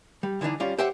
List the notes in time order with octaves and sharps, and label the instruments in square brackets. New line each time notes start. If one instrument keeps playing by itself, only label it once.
[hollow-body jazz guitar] G3
D3 E3 A#3 D4 D#4
G3 C#4 F4 D5
G4 C5 E5 F#5 G5